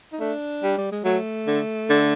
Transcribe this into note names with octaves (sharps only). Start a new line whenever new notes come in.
D#4
A3 D4
G3
G3
G#3
F#3 A3
D3
D3